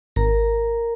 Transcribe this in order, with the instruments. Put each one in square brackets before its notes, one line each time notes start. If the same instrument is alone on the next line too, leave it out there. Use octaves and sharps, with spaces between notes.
[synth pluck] G#1 [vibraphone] A#4 A#5